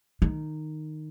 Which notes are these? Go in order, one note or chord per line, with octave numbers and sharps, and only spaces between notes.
D#3